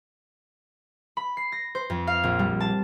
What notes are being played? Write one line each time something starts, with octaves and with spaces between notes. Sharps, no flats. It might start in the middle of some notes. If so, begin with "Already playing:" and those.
B5
C7
A#6
C5
F2
F5
A#1
G3
A5